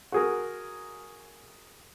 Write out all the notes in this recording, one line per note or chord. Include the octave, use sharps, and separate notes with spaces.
F#4 G#4 A#4